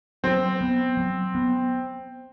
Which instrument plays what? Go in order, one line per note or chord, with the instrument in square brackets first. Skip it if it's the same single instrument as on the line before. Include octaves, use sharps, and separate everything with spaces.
[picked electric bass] F#3 [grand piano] C4
[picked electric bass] B3
F#3
B3